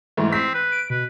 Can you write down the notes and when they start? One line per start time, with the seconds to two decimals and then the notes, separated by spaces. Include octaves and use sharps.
0.17 G#2 E3 A3
0.33 C4 B6
0.54 B4
0.72 D7
0.90 B2 B4